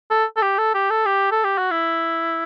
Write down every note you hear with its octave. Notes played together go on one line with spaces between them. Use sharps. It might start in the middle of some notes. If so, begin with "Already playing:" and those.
A4
A4
G4
A4
G4
A4
G4
A4
G4
F#4
E4